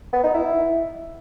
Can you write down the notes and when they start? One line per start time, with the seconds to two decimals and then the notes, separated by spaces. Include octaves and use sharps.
0.13 B3
0.24 D#4
0.34 E4